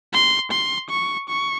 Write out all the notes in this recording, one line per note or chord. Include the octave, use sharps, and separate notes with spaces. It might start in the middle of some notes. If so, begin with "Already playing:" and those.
C6
C6
C#6
C#6